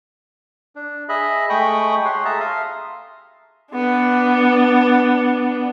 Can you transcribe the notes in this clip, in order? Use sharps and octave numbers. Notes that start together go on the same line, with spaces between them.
D4
G#4 D#5 E5 B5
G#3 A3 G5 B5 C#6 D#6
G4 C#5 F#5 C6
G#4 A4 E5 A5 A#5
E5 F5 C6 D#6
B3 D4